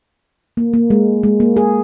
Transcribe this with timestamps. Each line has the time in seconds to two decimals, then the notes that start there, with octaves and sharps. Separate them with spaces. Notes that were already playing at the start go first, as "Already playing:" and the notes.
0.57 A#3
0.73 A#3
0.90 G#3
1.23 G#3
1.40 A#3
1.57 G#4